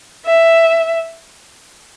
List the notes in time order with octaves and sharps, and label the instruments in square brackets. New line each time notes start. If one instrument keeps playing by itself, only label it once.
[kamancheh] E5